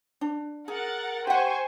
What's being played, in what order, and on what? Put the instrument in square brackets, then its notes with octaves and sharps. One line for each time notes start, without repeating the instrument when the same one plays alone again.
[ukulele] D4
[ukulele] G#4 [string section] A#4 F#5 A6
[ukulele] G4 F#5 [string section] C5 G#5 C#6